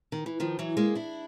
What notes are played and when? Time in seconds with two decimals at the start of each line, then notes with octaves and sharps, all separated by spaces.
0.12 D#3
0.26 E3
0.40 D#3 F3
0.59 E3 F#3
0.77 G#3 A#3
0.95 D4 E4